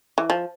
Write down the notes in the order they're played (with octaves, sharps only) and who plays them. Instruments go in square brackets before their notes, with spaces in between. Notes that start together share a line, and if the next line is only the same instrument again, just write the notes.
[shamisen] E3
F3